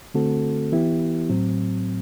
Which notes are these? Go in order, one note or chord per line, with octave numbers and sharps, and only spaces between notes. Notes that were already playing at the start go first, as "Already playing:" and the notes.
D3 A3 C4 F#4 A4
E3 B3 E4 G4
A2 F#3 C4